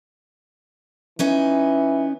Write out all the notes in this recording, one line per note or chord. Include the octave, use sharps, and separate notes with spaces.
E3 B3 C#4 D#4